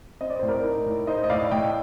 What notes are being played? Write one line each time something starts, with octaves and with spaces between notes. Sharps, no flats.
C4 D#5
D5
A2 C5
A#4 D5
D#4
A2
D#4 C5 D#5
D#5
A2 D5 F5
A2 D#5 G5